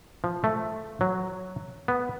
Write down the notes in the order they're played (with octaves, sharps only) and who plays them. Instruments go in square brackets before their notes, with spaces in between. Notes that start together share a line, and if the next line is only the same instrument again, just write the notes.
[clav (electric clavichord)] F3
A3
F#3
B3